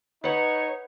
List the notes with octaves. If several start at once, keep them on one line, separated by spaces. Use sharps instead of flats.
D#4 B4 C#5 F#5